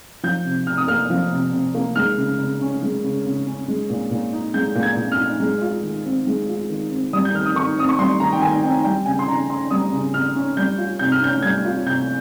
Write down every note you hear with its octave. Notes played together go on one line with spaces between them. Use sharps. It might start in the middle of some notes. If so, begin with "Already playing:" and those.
F3 G6
C3
C3 F6
D#6
A#3 F6
F3
C3
C3
A#3
G#3 F6
C#3
C#3
C#4
G#3
C#3
C#3
C#4
G#3
A#2
A#2
D#4
G#3 G6
A#2
G#6
A#2
F6
D#4
G#3
F4
D#3
C4
G#3
F4
D#3
C4
G3 D#6
G6
D#3 F6
D#6
D#3 C#6
C4 D#6
C#6
G3 C6
D#3 A#5
G5
D#3 G#5
C4 G5
G3 G5
C#3 G#5
C6
C#3 A#5
C#4 C6
G3 D#6
C#3
C#3 F6
C#4
G3 G6
F4
C3 G6
F6
C#4 G6
G3 G#6
F4
C3 G6